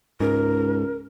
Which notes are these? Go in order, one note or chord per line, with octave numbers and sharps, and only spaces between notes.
C#2 G#2 A#4